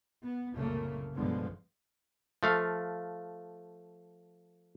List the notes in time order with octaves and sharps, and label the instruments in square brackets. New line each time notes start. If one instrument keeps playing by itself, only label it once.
[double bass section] B3
C2 F#2 A#2 C#3 A3 A#3
B1 G2 D3 F3 G#3 B3
[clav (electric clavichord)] F3 A3 F5